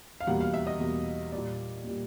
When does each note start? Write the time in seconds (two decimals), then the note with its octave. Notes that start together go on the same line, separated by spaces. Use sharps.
0.21 F5
0.27 E2 B2 G3 A#3 F#5
0.41 F5
0.54 E5
0.67 D#5
0.80 E2 B2 G3 A#3
1.32 A#2 G3 A#3 D5
1.84 A#2 G3 A#3